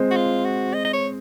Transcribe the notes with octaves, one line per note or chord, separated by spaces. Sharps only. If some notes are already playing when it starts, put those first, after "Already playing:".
Already playing: G#3 C4
F#4
F4
F#4
D#5
D#5
C#5